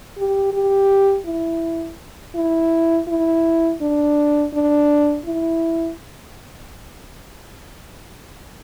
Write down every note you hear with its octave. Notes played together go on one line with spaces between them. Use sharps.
G4
G4
E4
E4
E4
D4
D4
E4